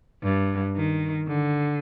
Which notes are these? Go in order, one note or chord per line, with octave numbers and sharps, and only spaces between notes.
G2
D#3
D3